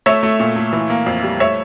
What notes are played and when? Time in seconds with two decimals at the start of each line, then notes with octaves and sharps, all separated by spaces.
0.06 A3 C#5 E5
0.23 A3
0.40 A#2
0.56 A3
0.73 E3
0.90 A#3
1.06 F2
1.23 G3
1.40 A3 C#5 E5